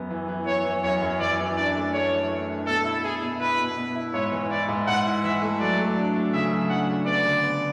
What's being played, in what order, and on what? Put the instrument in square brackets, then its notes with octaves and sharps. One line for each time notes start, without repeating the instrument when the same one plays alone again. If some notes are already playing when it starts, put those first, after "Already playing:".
Already playing: [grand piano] F#2 B3
E3
E3
[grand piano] E3 [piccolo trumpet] C#5
[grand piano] E3
[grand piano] F#2 [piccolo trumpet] C#5
[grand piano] F#2
[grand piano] E3 [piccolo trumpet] D5
[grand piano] E3
[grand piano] D4 [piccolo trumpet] D5
[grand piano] A3
[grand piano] A3 [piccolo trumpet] C#5
[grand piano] E3
A3
D4
[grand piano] B2 [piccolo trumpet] A4
[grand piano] E4
[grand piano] E4 [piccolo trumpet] G#4
[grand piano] B2
[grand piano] E4 [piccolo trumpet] B4
[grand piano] B2
B2
E4
[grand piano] G#2 [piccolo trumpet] C#5
[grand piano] E3
[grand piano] E4 [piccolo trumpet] D5
[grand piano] G#2
[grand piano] G#2 [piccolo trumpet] F#5
[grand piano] E4
[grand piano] E3 [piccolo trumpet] E5
[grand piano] A3
[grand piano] F#3 [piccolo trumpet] D5
[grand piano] A3
D4
A3
[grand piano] C#3 [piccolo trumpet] E5
[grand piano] F#3
[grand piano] D4 [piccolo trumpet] F#5
[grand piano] C#3
[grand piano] B3 [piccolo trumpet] D5
[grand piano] D3
B3